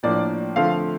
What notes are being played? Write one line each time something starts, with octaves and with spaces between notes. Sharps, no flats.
A2 F3 A#3 D4 D5
D3 F3 A3 C4 F5